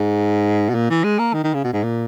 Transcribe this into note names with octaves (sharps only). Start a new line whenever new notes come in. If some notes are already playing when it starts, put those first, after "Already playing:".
Already playing: G#2
B2
A#2
E3
G#3
A#3
D#3
D#3
C#3
B2
G#2
A#2